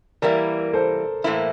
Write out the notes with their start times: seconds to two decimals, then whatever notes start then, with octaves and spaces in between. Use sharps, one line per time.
0.22 E3 G3 A#3 E4 A#4 D5
0.73 A4 C5
1.24 A2 E3 A#3 E4